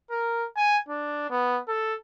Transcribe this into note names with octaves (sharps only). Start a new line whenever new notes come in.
A#4
G#5
D4
B3
A4